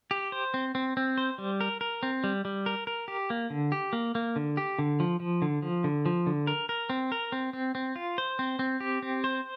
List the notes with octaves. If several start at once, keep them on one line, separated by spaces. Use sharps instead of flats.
G4
C5
C4
C4
C4
C5
G3
A#4
A#4
C4
G3
G3
A#4
A#4
G4
A#3
D3
G4
A#3
A#3
D3
G4
D3
F3
F3
D3
F3
D3
F3
D3
A#4
A#4
C4
A#4
C4
C4
C4
F4
C5
C4
C4
G4
C4
C5